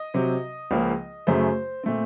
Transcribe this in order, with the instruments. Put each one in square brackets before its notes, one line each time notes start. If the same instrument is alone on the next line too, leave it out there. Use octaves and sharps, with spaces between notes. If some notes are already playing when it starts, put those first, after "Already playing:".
Already playing: [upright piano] D#5
C3 F#3 C4
C#2 C#3 F3 A#3 C#4
F#2 C#3 F#3 A3 C#4 C5
A#2 A3 C4